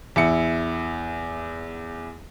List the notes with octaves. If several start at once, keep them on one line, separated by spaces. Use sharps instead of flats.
E2 E4 C#7